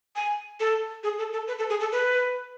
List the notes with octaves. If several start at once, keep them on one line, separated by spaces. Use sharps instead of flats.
G#5
A4
G#4
A4
A4
B4
A4
G#4
A4
B4